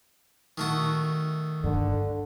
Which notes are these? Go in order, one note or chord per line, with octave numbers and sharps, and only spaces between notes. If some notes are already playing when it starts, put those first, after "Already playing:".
D#3 A3 F#4
G2 D3